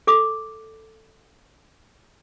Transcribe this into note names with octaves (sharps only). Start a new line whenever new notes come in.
A4 D6